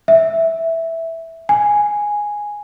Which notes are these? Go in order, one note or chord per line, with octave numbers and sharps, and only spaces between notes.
E5
G#5